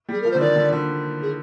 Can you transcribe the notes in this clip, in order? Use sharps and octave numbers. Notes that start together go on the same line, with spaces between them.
G3
G#4
F3 A#4
D3 C5
D#3 D5
D3
D3
G#4